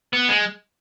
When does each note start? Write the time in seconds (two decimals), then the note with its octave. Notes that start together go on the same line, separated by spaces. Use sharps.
0.13 B3
0.29 G#3